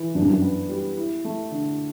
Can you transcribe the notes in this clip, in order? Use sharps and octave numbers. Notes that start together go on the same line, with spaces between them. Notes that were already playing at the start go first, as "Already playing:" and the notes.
Already playing: E3
F#2 D4
G2
F#2
B3
G3
E4
A3
D3